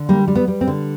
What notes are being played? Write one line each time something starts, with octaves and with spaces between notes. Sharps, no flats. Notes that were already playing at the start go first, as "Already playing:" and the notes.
Already playing: D3
G3 A#3
G3
B3
G3
C4
D3